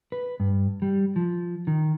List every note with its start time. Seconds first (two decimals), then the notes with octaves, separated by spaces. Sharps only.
0.12 B4
0.40 G2
0.82 G3
1.16 F3
1.67 D#3